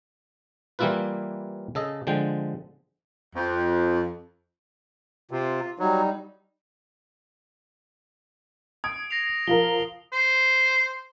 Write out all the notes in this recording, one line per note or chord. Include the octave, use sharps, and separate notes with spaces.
E3 G3 A#3 E4 F4 B4
C#3 A4 D#5
D3 F3 G#3 G5
F2
C3 F4
F#3 G3 D#4
D#6 G#6 D7
A#6 C7 F7
F3 F4 A#4 G7
C5